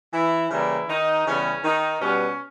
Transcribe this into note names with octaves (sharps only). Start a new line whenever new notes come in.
E3 E4
C#3 E3 G3 A#3 E4
D#3 D#4
C#3 E3 G3 B3 C#4
D#3 D#4
B2 G3 B3 C#4